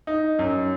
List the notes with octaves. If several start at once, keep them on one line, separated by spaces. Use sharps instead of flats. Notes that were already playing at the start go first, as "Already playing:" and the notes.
D#4
F#2